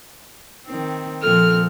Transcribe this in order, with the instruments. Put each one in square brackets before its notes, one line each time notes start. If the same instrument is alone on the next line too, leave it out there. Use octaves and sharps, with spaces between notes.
[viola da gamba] D#3 C4
[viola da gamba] A#2 F3 C4 [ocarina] A4 [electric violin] F6